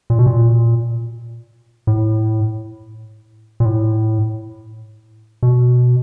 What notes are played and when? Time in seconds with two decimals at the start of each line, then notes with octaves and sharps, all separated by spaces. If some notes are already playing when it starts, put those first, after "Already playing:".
0.10 A#2
0.19 B2
0.26 A#2
1.87 A2
3.60 A#2
3.65 A2
5.43 B2